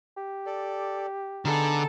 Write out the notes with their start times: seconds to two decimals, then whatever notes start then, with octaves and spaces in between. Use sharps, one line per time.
0.17 G4
0.46 A4 D5
1.45 D3 B3 D#4 G#4 A4